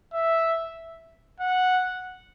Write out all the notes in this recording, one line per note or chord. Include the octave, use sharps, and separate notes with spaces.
E5
F#5